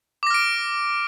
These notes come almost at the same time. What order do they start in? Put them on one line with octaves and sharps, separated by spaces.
D6 A#6 F6 D7